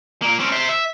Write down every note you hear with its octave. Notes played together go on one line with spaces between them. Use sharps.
A#2 A#3
C4 C#4
C5 E5
E5